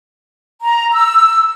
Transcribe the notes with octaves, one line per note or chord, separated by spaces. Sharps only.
A#5
E6